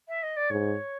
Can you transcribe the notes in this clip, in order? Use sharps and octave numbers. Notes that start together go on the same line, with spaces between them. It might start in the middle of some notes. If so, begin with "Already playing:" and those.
E5
D#5
D5
G#2 C#5